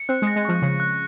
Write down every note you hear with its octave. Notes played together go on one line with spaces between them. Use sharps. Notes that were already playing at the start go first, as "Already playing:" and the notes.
Already playing: C#7
C4 F#6
G#3
A#6
G#3
F3 C#6
C#3 C#6
F#6